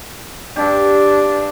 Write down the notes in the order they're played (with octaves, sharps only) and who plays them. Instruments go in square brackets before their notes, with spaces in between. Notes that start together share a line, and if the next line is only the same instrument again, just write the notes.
[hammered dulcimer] G2 G4 [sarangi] D4